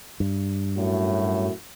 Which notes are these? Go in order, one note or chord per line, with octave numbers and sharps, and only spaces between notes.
G2
F#2 A2 F#4